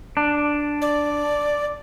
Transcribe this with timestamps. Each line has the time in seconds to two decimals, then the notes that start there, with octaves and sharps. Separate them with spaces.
0.17 D4
0.82 D5